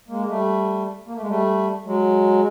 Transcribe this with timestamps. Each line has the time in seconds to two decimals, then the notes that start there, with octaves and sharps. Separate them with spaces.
0.08 G#3 A#3
0.28 G3 A3
1.06 A#3
1.14 A3
1.21 G#3
1.28 G3 A3
1.85 F#3 G#3